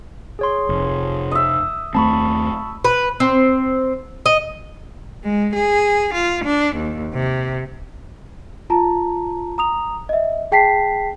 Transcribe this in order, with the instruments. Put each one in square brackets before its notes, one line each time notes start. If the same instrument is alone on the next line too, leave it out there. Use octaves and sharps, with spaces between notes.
[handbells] G#4 C#5 C6
[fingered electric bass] F1
[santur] D#5 E5
[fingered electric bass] D#2 A3 C4 [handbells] A5 B5 C#6
[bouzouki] B4
C4
D#5
[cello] G#3
G#4
F4
D4
D#2
C3
[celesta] F4 A5 A#5
A#5 D#6 F7
D#5 E5
G#4 G5 A5 B6 C7